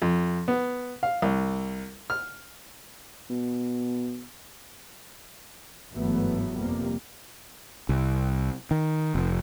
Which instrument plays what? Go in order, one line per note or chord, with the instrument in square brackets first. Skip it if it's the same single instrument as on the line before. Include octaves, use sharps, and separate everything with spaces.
[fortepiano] F2
B3
F5
C2
F6
[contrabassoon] B2
[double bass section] G1 G#2 E3 F#3 A3 B3
F2 C3 G3 A#3
[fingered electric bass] C2
D#3
F1